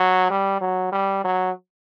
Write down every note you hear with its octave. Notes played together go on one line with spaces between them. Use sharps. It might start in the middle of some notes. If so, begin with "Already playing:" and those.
Already playing: F#3
G3
F#3
G3
F#3